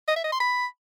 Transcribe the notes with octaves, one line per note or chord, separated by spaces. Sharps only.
D#5
E5
D#5
C6
B5